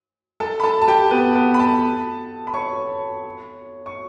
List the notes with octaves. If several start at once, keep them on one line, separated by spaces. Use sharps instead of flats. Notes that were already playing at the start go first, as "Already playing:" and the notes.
A4 A5
B5
A4 A5
A5
G4 G5
B3 B4
B3 B4
B5
A4 A5
B5
C#5 C#6
C#6